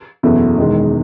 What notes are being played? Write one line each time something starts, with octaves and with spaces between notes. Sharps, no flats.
F#1 E2 B2 A3 E4
E1 E2 D#3 G#3